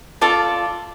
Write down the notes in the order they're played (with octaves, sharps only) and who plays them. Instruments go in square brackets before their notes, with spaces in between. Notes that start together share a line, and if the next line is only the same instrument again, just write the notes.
[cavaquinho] F4 A4 D5 A5